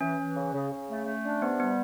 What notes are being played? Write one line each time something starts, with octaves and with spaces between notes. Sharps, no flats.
E3 C#4
E3
C#3
C#3
C#3
A3
A3
D4
C3 B3
G3 B3